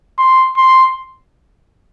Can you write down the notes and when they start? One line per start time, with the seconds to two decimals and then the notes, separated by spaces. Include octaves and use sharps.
0.18 C6
0.57 C6